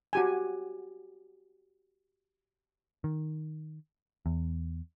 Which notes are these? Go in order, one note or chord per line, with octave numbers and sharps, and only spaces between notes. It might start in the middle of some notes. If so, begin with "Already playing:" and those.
F#4 G4 G#5
D#3
E2